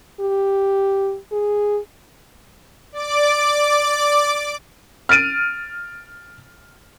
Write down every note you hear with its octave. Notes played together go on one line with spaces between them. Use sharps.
G4
G#4
D5 D6
F6 A6 D7 D#7